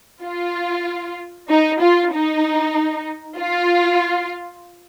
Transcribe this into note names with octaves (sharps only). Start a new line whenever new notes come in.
F4
D#4
F4
D#4
F4